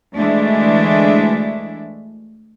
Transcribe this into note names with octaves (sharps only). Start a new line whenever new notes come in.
D2 E3 G#3 A3 D4 E5